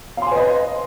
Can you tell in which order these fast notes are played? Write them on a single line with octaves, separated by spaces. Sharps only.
F5 C6 G#5 B4 D#5